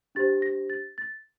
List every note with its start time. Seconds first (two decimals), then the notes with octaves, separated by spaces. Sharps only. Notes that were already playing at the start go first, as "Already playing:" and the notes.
0.15 D4 G4 C5 A6
0.42 A#6
0.70 A6
0.98 A6